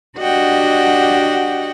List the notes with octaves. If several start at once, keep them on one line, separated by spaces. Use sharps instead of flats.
D4 F#4 G4 D#5 F#5 G5